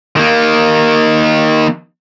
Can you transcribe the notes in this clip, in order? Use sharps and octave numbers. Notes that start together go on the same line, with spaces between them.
D#3 A#3